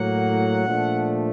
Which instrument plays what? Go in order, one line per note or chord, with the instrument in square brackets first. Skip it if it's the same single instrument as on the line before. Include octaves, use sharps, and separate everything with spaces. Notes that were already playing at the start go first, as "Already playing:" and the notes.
Already playing: [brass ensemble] A2 F#3 A#3 F#5
A#2 F3 A3 D4